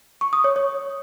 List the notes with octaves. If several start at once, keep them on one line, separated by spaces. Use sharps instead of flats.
C#6
D#6
C#5
C#5